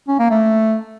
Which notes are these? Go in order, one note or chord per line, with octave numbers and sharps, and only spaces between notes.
C#4
A#3
A3